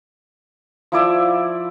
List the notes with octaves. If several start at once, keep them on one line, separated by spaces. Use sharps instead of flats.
F3 E4 D5 E5